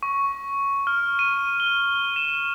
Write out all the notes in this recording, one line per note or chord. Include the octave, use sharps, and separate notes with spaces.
C#6
F6
D#7
G7
E7